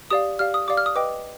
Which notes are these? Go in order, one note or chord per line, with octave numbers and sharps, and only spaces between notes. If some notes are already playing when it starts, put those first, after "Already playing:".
G4 D5 F5 D#6
G4 D5 F5 F6
D#6
G4 D5 F5 D6
F6
D#6
B4 D#5 G5 D6